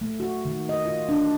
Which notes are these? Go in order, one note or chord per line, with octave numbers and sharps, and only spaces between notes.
A3
F#4
D#3
D#5
F4
D4